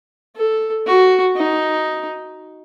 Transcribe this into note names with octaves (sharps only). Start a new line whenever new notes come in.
A4
F#4
D#4